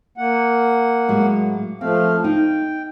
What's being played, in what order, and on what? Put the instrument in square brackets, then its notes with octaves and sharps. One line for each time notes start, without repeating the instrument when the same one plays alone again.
[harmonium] A#3 F#5
[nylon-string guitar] A2 F#3 G#3
[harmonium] F3 A3 F5 [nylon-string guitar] C4
[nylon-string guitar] D#4 [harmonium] G5